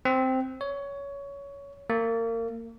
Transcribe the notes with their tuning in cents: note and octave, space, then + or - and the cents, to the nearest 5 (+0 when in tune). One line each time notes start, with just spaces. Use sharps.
C4 -5
C#5 +20
A#3 -30